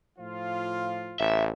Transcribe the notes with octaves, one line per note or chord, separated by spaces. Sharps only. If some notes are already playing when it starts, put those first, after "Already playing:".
A2 F3 F4
A1 E5